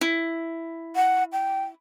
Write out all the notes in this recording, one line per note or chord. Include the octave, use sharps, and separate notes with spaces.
E4
F#5
G5